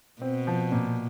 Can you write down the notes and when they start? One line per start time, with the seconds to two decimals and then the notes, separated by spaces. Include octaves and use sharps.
0.22 B2 C4
0.47 F3
0.72 A#2